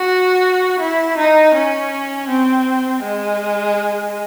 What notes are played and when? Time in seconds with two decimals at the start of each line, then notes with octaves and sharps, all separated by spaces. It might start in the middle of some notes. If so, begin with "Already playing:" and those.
Already playing: F#4
0.80 E4
1.17 D#4
1.54 C#4
2.29 C4
3.03 G#3